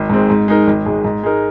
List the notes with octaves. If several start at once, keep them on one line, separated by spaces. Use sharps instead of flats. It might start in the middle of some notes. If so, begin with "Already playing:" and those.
Already playing: G#1
G#2 G#3 C4
G#2
G#3 D#4 A#4
G#1
G#2 G#3
G#2
G#3 D#4 A#4